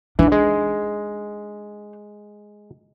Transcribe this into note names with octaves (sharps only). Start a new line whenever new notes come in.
E3 D4 D#4
G#3